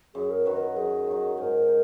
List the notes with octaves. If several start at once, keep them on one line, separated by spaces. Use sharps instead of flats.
F#2 G#4
A#4
D#3 F#3 B4
A#4
B4
F#2 G#4
D#3 F#3
G#2 A#4
D#4